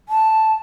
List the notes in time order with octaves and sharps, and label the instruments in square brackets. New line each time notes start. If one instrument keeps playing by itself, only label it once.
[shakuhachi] A5